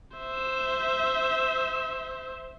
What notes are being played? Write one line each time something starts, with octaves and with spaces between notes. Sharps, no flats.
C5 E5